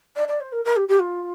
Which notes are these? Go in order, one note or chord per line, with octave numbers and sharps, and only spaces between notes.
D5
D5
C5
A#4
A#4
G4
G4
F4